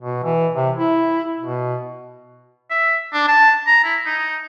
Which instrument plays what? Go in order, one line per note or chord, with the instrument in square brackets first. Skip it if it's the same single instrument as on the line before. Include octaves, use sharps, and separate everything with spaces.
[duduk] B2
E3
C3
E4
B2
[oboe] E5
D4
A5
A#5
E4
D#4